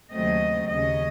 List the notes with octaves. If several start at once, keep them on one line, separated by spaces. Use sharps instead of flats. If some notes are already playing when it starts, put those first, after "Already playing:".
D#2 C#3 F#3 A3 C4 D#5
D#2 C#3 F#3 C#4 D#5